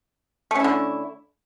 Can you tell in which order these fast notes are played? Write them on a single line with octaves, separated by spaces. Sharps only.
A3 C#4 E4 D3